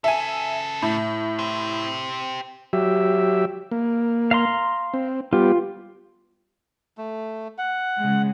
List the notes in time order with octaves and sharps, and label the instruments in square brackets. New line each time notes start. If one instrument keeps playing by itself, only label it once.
[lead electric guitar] C#3 A4 [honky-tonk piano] E5 G#5
[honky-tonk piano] A2
[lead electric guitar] G4 C5
[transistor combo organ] F#3 G4 E5
A#3
[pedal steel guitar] F5 A#5 C6
[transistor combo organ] C4
[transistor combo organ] G3 B3 G4 [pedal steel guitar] F4
[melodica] A3
F#5
[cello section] C#3 G#3